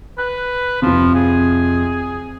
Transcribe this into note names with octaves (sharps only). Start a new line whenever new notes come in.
B4 F#6
F2 C3 F3
G#4